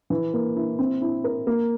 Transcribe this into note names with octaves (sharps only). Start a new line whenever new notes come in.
E3
A#3
E4
C4
E4
A#4
A#3